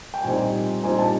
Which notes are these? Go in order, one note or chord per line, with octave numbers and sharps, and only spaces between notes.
G5
A#1 A#2 G3 C4 D#4 G#5
A#1 A#2 G3 C4 D#4 G#5
A5